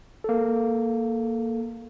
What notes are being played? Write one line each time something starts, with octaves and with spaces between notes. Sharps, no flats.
A#3 A4